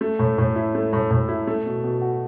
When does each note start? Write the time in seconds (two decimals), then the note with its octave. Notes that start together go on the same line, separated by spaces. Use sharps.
0.01 A3
0.19 A2
0.38 A2
0.56 E4
0.75 A3
0.93 A2
1.11 A2
1.28 E4
1.47 A3
1.66 B2
1.84 B2
2.02 F#4